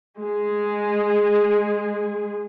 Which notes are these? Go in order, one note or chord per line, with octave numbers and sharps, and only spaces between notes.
G#3 G#4